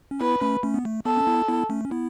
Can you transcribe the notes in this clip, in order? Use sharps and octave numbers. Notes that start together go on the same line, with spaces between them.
C#4
B3 E4 B4
A3 C#4
A3 C#4
B3
A3
B3 A4
C#4
B3 E4
B3 E4
A3 C#4
C#4
B3 E4